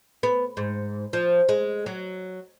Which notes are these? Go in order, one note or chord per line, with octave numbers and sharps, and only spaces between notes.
B3
G#2
F3
G#3
F#3